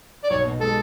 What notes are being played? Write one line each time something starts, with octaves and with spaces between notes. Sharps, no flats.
D5
B1 C#5
B2
G#3 A4